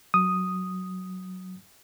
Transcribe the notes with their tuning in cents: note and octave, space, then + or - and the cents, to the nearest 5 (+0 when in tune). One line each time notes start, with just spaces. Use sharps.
F#3 +0 D#6 +0